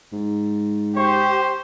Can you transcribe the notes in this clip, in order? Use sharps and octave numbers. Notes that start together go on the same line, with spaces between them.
G#2
G4 C5 C#6